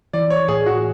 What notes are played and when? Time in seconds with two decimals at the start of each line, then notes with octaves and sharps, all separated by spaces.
0.13 E3 D5
0.30 C#5
0.48 A2 G#4
0.66 F#4